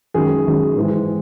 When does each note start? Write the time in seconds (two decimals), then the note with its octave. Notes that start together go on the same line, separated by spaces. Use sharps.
0.14 F#2 D#3 G#3 G#4
0.46 F#2 D#3 G#3
0.76 G#2 E3 G#3